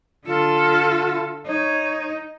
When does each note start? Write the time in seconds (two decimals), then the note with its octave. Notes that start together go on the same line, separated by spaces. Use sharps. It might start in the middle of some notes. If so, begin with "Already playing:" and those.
0.26 D3 F4 A4
1.46 D#4 C#5